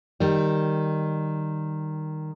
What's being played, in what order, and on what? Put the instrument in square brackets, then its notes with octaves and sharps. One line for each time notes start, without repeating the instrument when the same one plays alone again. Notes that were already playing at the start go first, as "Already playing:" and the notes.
[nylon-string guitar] D#3 G3